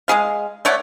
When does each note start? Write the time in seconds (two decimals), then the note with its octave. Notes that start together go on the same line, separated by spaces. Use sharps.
0.08 G#3 C#4 G#4 F5
0.65 A3 C#5 D5 F#5